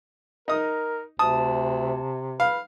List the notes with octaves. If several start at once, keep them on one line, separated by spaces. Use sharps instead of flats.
D#4 A#4 D#6
D2 C3 A5 D#6
B4 F5